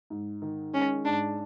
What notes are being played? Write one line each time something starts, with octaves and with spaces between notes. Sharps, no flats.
G#2
D#3
G#3 C#4
G#2 D4